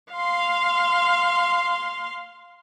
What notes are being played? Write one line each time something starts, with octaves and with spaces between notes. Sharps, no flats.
F5 C6